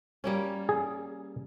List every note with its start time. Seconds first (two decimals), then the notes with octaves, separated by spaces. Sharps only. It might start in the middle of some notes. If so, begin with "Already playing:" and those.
0.24 G3 A#3 C#4
0.69 G#4